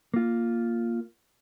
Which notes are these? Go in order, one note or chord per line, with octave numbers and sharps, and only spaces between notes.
A#3 F4